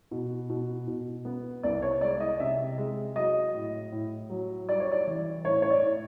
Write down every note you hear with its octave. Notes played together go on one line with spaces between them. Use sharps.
B2
B2
B2
B3
C2 D5
C#5
G#3 D5
D#5
C3 E5
G#3
F#3 D#5
A2
A2
F#3
G3 D5
C#5
D5
E3
A2 C#5
C#5
D5
A2